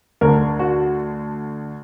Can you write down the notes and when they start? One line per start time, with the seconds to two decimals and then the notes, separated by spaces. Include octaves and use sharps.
0.21 D2 D3 A#4
0.59 F#4